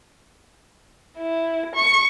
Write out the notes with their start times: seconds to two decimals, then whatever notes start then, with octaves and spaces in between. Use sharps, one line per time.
1.18 E4
1.76 C#6